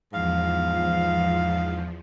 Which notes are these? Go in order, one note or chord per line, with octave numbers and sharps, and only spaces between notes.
E2 G#2 F3 F5